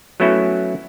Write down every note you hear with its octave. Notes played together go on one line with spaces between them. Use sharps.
F#3 A3 B3 C#4 E4 F#4